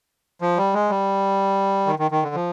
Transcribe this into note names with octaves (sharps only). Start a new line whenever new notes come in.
F3
G3
G#3
G3
D#3
D#3
D#3
D3
F3